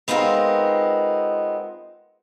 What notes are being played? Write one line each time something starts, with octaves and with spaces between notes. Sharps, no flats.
G#3 B3 C4 D#4 F4 A#4